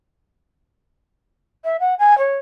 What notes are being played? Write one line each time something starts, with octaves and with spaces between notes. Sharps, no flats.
E5
F#5
G#5
C#5